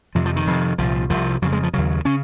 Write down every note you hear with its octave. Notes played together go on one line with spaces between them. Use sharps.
F2 C3 F3
F3
D#3
F2 C3
C2 A#2 F3
C2 C3 F3
F2 C#3 F#3
G#3
F3
D#2 C#3 F#3
C#3 C#4